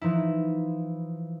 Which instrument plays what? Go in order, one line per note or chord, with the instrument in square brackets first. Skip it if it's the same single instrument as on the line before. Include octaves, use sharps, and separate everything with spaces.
[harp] E3 F3 D#4 E4